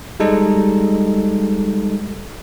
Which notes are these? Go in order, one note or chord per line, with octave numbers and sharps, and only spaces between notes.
G3 G#3 D#4 A4